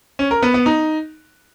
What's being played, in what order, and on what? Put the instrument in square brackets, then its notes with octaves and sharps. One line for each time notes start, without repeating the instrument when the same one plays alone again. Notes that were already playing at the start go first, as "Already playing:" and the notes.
[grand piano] C#4
A#4
B3
B3
D#4